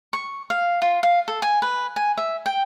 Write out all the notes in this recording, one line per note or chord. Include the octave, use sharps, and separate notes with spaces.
C#6
F5
F4
F5
A4
G#5
B4
G#5
E5
G5